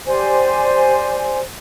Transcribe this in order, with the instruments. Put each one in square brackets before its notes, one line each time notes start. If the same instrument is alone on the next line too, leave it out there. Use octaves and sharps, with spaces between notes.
[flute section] G4 C5 D5 G#5